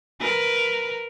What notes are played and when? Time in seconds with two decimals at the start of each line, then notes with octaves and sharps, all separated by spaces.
0.20 A#4 B4